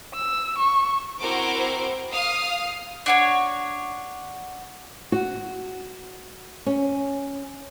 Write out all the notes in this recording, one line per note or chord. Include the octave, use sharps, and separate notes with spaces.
E6
C#6
C4 E4 F#4 A#4 C5 D6
F5 D#6 F6 C7
D4 F#4 C#5
F#4
C#4